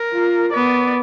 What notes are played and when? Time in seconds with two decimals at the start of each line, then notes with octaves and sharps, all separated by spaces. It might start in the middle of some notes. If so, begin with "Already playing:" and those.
Already playing: A#4
0.13 F4
0.53 B3 D5